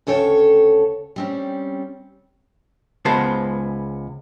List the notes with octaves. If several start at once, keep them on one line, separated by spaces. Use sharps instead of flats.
D2 C#3 A4 C#5 G5
G3 C4 C#4
C#2 G#3 B3 C5 A5